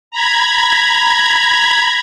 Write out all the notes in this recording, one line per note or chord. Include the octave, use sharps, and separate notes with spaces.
A#5 B5 G#6